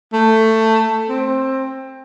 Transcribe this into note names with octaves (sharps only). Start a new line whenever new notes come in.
A3
C4